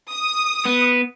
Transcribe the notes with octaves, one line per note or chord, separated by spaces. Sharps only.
D#6
B3